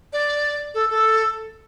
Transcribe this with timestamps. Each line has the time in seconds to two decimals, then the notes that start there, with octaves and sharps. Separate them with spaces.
0.13 D5
0.74 A4
0.90 A4